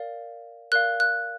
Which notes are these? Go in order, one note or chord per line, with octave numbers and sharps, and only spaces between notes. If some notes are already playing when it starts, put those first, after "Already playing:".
Already playing: A#4 D5 F5
A#4 D5 F5 F#6
F#6